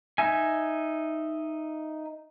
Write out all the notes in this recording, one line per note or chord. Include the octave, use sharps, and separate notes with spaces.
D#4 E5 G#5